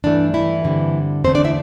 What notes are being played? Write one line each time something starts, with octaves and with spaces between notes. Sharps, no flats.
G2 E3 A3 D4
E3 E4
G2 D3 G3 C4
E2 D3 A3 C4 C5
D4 D5
E4 E5